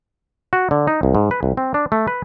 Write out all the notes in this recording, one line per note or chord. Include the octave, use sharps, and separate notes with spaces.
F#4
D3
D#4
C2
G#2
B4
C2
C4
D4
A3
B4